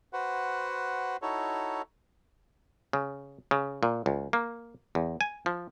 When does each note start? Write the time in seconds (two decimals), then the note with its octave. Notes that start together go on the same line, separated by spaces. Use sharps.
0.13 F#4 B4 C5 F#5
1.22 D#4 E4 F#4 A4 C#5
2.93 C#3
3.51 C#3
3.83 A#2
4.06 C#2
4.33 A#3
4.95 E2
5.21 G#5
5.46 F3